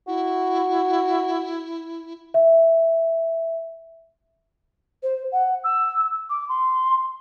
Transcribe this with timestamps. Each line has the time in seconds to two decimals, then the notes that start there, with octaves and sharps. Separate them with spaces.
0.07 E4 F#4
2.34 E5
5.03 C5
5.32 F#5
5.64 E6
6.30 D6
6.49 C6